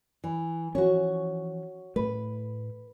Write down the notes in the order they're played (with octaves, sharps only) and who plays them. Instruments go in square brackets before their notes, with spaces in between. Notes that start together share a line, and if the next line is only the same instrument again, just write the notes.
[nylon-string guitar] E3
[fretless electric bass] E3 F3 C#4 [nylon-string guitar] F#4 C#5
[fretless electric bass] A2 A3 [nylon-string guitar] B4